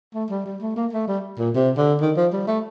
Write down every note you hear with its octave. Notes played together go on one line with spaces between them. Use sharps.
A3
G3
G3
A3
A#3
A3
G3
A#2
C3
D3
D#3
F3
G3
A3